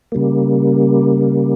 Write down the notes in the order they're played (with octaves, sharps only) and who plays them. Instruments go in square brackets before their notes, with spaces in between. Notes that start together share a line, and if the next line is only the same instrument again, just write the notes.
[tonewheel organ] C#3 G3 A#3